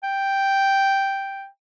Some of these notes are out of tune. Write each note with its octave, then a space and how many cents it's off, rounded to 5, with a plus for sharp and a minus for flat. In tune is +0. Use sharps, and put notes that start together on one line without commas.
G5 +0